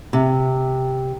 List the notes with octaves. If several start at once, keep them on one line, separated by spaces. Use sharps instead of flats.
C3